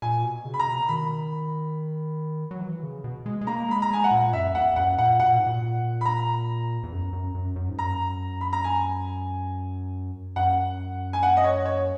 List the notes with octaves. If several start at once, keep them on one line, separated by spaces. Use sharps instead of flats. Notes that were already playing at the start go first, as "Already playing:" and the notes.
A#2 G#5
B2
C#3
B5
A#5
B2
D#3 B5
F#3
E3
C#3
B2
G#3
G#3
A#3 A#5
G#3 B5
A#5
G#3 G#5
F#5
A#2
F#2 E5
E2 F#5
F#2 F#5
A#2 F#5
B2 F#5
A#2
G#2
A#2
B5
A#5
E2
F#2
F#2
F#2
F#2
G#2
F#2 A#5
B5
A#5
G#5
F#2 F#5
G#5
F#5
D#5
C#5
C#5